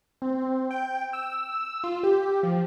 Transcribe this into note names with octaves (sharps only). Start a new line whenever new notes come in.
C4
G5
E6
E6
F4
G4
F3